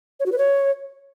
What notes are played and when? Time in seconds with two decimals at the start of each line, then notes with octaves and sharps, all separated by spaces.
0.20 C#5
0.26 F#4
0.32 B4
0.38 C#5